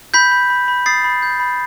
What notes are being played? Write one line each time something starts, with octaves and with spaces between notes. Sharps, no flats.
B5 G6 B6
B5
B5
B5
D#6 A6 C7
B5
G6
B5